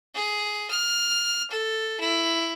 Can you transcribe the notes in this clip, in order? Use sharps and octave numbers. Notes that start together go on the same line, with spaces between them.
G#4
F6
A4
E4